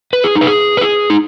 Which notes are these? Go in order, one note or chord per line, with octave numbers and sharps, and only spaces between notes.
B4
G#4
D#4
B4
G#4
B4
G#4
D#4